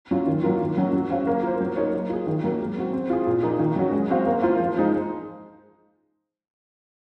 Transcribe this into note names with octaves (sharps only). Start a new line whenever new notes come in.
F#3 C#4 F4
D#3
F#3 A#3 F4
D#3
F#3 C#4 F#4
F#3
C#4 F#4 C5 F5
A#3
F4 C5
F#3
A#3 D#4 A#4 C#5
A#3
F4 G#4
D#3
F#3 A#3
G#3
C4 F#4
C4
F4 G#4
A#2
F3 A#3 D#4 G#4
D#3
F#3 C#4 F#4
G#3
C4 F#4 C5 F5
A#3
F4 C5 F5
F3
G#3 D#4 G#4 C5